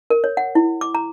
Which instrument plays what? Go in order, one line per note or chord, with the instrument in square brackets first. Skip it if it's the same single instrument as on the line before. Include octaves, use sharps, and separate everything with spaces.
[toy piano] A#4
C#5
F#5
E4
D6
A#5